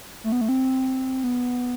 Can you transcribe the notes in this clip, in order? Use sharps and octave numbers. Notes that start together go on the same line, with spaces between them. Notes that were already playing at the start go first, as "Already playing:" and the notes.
A3
B3
A3
C4
B3